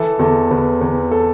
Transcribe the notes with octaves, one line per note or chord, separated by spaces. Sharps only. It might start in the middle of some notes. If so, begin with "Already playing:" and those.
Already playing: E3 A4
E2 A4
E2 B4
E2 B4
A4